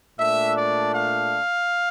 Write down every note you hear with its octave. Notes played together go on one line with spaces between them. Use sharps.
A#2 A3 D4 E5
D5
F5